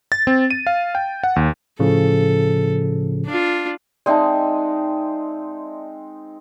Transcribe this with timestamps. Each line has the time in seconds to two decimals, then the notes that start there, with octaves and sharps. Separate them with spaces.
0.12 A6
0.27 C4
0.50 D#7
0.67 F5
0.95 G5
1.23 F#5
1.36 D#2
1.79 A2 C#3 F3 A4
3.26 D4 F4
4.06 G#3 C4 D#4 D5 E5 A5